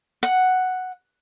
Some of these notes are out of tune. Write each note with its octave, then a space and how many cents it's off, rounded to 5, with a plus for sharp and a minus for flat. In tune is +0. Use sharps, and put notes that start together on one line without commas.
F#5 +0